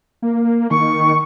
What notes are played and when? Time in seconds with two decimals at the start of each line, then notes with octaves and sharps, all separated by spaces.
0.22 A#3
0.71 D#3 C#6